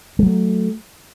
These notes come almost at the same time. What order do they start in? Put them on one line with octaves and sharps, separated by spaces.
G#3 F#3 A3